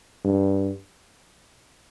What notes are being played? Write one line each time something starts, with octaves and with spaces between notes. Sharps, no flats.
G2